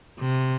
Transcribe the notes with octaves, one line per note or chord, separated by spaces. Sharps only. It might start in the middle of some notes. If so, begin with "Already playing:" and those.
C3